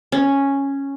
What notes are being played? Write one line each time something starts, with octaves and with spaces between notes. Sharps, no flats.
C#4